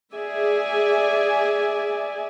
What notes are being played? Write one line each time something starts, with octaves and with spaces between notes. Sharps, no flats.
G#4 D5 E5 G#5